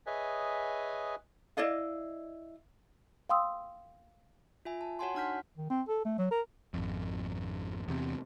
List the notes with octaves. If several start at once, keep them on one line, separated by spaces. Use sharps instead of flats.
G#4 B4 C#5 D#5 E5 G#5
E4 D5 D#5 F5
F5 G5 C6 D#6 E6
F4 E5 G#5
A5
F#4 C#5 F#5 G#5 A5 C6
D4 D#4 F#5 F6 G6 B6
D#3
C4
A4
A3
F#3
A#4
G#1 F2
E2 C3